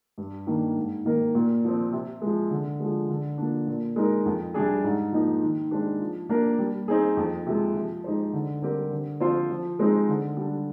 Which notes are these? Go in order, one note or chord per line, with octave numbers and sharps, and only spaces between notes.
G2
D#3 A#3 D4
G#2
D#3 A#3 D#4 A#4
A#2
F3 C4
C3
F3 G#3
D3
F3 G#3
D3
F3 A#3 D4
A#2
G#3 D#4 A#4
F2
C3 G3 D4 G#4
G#2
F3 A#3 D#4 G4
D#3
G#3 D4 G4 C5
F3
A#3 D4 G4 A#4
G3
C4 D#4 G#4
F2
C3 F3 G#3
F3
G#3 D#4 G4 C5
D3
G3 C4 G4 A#4
D3
F3 C4 F4 C5
F3
G#3 C4 D#4 G#4
D3
G3 D4